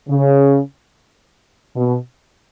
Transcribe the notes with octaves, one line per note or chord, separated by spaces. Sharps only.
C#3
B2